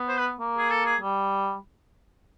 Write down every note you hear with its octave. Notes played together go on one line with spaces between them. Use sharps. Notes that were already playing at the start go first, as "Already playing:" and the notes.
Already playing: B3
C5
B4
A#3
G#4
A4
G#4
G3